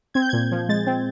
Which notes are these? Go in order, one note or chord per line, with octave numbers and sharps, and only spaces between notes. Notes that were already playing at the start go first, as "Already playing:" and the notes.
C4 G#6
G6
A#2 G#6
F3
G#3 A6
C4